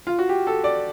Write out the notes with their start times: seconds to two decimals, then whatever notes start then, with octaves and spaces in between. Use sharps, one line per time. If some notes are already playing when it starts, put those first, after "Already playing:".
0.07 F4
0.19 F#4
0.29 G4
0.47 A4
0.64 D5